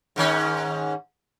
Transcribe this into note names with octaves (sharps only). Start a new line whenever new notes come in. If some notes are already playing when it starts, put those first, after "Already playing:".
G#2 D#3 C#4